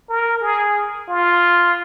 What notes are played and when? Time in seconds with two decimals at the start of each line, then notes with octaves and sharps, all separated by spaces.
0.09 A#4
0.41 G#4
1.08 F4